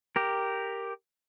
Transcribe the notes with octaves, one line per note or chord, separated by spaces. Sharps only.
G4 A#4